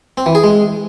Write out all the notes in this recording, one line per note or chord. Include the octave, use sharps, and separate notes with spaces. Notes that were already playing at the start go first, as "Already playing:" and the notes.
C4
E3
G#4
G#3